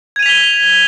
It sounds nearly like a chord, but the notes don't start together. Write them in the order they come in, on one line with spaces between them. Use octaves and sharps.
G#6 D#7 F7 B6 G7